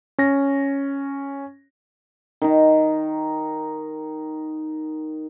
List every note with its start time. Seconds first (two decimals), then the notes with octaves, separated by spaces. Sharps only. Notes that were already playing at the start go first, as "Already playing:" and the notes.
0.19 C#4 A#6
2.42 D#3 D#4